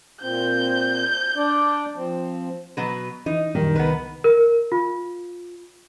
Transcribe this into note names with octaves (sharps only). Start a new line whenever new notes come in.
A#2 C4 G6
D4 D5
F3 C4
B2 F#3 B4
E3 D#4
F#2 A#2 D#3 G3
C2 B3 B4
A#4
F4